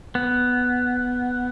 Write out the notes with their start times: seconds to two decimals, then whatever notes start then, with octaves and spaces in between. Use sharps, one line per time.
0.15 B3